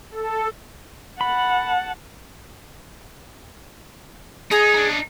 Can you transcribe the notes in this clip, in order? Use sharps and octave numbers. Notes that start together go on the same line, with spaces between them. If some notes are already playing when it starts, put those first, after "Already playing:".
A4
F#5 A5 B5
D#4 G#4
D4 D#4